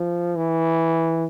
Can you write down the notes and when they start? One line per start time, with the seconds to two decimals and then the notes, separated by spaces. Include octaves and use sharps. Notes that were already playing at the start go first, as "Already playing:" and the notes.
Already playing: F3
0.36 E3